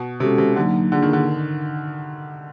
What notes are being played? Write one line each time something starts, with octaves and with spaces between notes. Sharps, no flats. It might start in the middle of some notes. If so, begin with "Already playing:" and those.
Already playing: B2
C3 G#3 C#4 F#4 A4
C3
D3 F#3 A#3 D#4
D3 A#3 D4 F4 G#4
D#3
D3